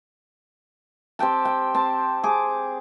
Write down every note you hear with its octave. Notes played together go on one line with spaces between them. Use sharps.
C4 G4 G5 A5
G5
C4 A5
G#4 D6